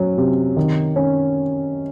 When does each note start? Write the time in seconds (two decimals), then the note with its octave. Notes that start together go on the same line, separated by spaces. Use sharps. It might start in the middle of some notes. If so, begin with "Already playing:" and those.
Already playing: F#3 C#4
0.18 C3
0.57 D#3
0.96 C#4